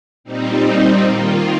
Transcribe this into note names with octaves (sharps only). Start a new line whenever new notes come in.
A#2 G3 C4 D#4
D#3 A#3 F4